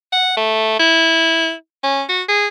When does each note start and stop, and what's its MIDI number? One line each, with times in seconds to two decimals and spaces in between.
0.12 0.35 78
0.37 0.75 57
0.79 1.54 64
1.84 2.03 61
2.09 2.22 66
2.29 2.48 68